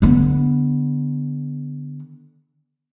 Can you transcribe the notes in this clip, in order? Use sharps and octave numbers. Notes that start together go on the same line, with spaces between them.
D3 B3